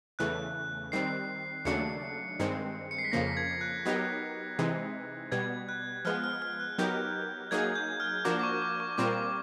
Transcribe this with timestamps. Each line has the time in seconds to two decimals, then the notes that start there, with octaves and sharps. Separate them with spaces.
0.19 E2 C#3 E3 A3 F#6
0.92 D#3 G3 C4 C7
1.65 D#2 C#3 F#3 A3 D4 C#7
2.40 G2 D#3 G#3 C4
2.91 C#7
2.98 C7
3.04 B6
3.12 F2 C#3 F3 A#3 A#6
3.37 G#6
3.61 F#6
3.85 F#3 B3 D#4 G4 A#4
4.59 C3 E3 G#3 C4 D#4
5.32 B2 G3 B3 G#6
5.69 F#6
6.05 F3 G#3 B3 F6
6.24 F6
6.42 F6
6.60 F#6
6.78 F#3 B3 D#4 G4 A#4 G6
7.51 F#3 A#3 D#4 G#4 G#6
7.76 G6
8.00 F6
8.25 F3 A#3 D4 F#4 A#4 D6
8.39 D6
8.43 C#6
8.62 C#6
8.80 C#6
8.98 A#2 G3 C4 F4 A#4 D6